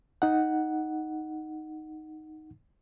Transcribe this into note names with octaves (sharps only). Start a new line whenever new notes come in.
D#4 F#5